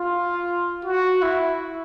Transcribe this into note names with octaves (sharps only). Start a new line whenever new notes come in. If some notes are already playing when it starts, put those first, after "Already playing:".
Already playing: F4
F#4
E4